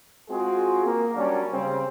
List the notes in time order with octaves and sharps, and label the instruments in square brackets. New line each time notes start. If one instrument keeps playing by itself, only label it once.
[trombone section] G#3 C4 F4 F#4 G#4
A#3
F#3 G3 A#3 C#4 D4 F#4
C#3 G3 C4